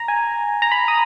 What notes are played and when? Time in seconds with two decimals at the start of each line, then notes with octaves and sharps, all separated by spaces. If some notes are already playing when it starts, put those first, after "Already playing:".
Already playing: A#5
0.08 G#5
0.62 A#5
0.72 B5
0.88 D#6